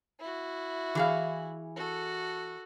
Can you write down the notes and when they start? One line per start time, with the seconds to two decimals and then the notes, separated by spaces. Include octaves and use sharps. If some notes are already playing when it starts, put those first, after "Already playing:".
0.20 E4 F#4
0.95 E3 G#4 F5
1.76 F#4 A4